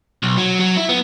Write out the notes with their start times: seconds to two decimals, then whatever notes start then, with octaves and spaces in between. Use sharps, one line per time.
0.23 B1
0.38 F#3
0.60 F#3
0.77 E4
0.89 B3